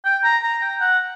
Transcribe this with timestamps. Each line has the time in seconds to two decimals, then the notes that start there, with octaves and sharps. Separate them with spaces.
0.05 G5
0.24 A#5
0.43 A#5
0.62 G5
0.81 F#5